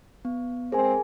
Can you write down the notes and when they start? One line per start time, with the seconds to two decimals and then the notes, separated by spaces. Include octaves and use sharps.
0.25 B3
0.72 G#3 C4 G#4 A#4 C5 G#5